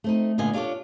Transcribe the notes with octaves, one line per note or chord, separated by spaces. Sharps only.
A3 C4 D#4
A#2 D3 B3 F4 D#5 G#5
D4 F4 G4 A4 C#5 D5